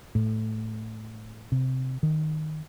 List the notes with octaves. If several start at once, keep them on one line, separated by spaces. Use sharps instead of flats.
A2
C3
D#3